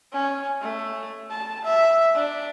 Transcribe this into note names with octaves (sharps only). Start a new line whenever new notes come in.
C#4
A3
A5
E5
D4